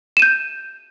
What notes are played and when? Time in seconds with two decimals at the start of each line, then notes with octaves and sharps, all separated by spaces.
0.17 E7
0.19 D#7
0.22 G6